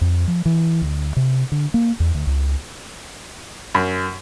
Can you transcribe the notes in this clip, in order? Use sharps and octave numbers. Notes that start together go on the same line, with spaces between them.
F2
F3
E3
D2
C3
D3
A#3
E2
D2
C#2
F#2